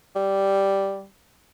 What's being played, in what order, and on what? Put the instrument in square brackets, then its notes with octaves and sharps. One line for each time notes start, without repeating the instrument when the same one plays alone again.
[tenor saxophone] G3